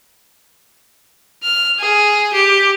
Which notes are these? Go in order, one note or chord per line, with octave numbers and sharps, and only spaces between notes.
F6
G#4
G4